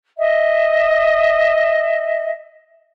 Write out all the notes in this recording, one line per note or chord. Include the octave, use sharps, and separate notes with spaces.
D#5 E5